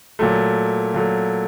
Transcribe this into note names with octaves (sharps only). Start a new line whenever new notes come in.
A#2 F#3 A3
A#2 F#3 A3